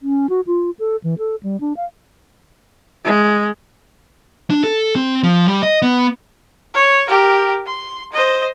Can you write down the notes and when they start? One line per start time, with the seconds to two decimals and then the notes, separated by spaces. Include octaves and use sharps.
0.02 C#4
0.29 F#4
0.47 F4
0.79 A4
1.03 E3
1.18 A4
1.43 G3
1.61 D4
1.77 F5
3.05 G#3
4.50 D4
4.63 A4
4.95 C4
5.23 F3
5.48 G3
5.63 D#5
5.82 B3
6.74 C#5
7.08 G4 A#4
7.66 C6
8.12 C5 D#5